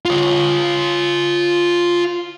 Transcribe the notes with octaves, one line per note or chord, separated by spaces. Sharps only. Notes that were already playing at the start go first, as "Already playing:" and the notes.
F4 C#5